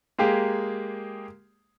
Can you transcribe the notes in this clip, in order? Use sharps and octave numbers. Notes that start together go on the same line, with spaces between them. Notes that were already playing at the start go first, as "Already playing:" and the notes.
G#3 A#3 G4 G#4